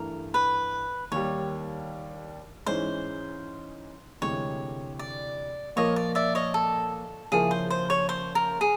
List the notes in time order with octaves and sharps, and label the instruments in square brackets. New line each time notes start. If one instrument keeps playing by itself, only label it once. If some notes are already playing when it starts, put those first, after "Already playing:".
Already playing: [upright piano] G2 E3 A3 [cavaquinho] A#4
[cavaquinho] B4
[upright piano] D#2 D#3 G3 [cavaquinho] C#5
[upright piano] G#2 E3 G#3 C#4 [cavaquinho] C5
[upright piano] D2 C3 E3 G#3 [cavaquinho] C#5
[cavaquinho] D5
[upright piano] A#2 F3 A#3 [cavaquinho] C#5 D#5
[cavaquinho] D5
D5 E5
C#5 D#5
A4
[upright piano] C#3 F3 A#3 C#4 E4 [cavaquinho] G#4
[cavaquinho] C5
C5
C#5
C5
A#4
G#4